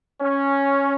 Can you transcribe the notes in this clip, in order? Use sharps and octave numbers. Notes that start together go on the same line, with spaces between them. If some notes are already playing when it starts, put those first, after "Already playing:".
C#4